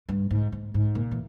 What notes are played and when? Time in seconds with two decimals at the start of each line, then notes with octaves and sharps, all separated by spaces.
0.09 G2
0.31 G#2
0.52 G#2
0.74 G#2
0.95 A#2
1.11 E3